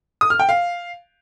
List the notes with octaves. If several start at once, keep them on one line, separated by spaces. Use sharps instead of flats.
D#6
F6
G5
F5